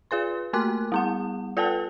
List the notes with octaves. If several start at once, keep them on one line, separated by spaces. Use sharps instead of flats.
F4 G#4 B4 C6
A3 A#3 A#4 C6 D6 F#6
G3 B3 F#5
F4 A4 B4 G5 A5